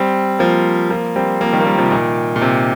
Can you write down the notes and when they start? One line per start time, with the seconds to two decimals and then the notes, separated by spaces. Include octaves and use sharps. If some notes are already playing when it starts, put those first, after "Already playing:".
Already playing: G3 C4
0.39 F3 A#3
0.90 F3 A#3
1.16 G3 C4
1.41 F3 A#3
1.53 D#3 G3
1.60 A#3
1.66 D#3 G3
1.78 C3 F3
1.90 A#2 D#3
2.36 A#2
2.42 C3